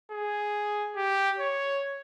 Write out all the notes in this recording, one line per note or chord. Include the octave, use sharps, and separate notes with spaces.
G#4
G4
C#5